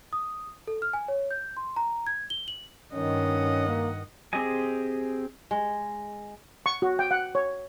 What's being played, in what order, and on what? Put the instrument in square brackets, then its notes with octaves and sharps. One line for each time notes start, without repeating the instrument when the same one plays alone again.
[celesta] D#6
A4
F6
G#5
C#5
G6
C6
A#5
G#6
G7
F#7
[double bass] G2 D#3 [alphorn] C#4 [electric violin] D#5 F#5
[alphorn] A#3
[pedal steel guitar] C4 G4 G#4 D#5 G#5
[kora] G#3
[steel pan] C#6
F#4
G5
F#5
C#5